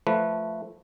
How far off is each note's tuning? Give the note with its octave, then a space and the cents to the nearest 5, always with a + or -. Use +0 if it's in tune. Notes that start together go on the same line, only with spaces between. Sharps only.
F3 +0 A3 +0 B4 +0